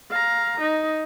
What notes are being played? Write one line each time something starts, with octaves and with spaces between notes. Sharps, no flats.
F5 A#5
D#4